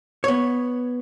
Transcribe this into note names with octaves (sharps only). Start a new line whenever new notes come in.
B3 C#5